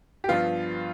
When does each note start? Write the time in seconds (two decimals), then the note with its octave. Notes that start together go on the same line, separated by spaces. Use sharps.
0.24 G4
0.28 G2 F3 B3 F4